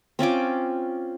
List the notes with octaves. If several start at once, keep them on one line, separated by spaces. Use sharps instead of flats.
C4 C#4 F4 D6